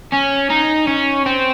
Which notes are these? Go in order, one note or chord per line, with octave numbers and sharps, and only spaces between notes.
C#4
D#4
C#4
C4